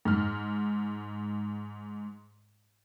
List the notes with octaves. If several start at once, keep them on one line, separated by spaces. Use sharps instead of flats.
G#2 F6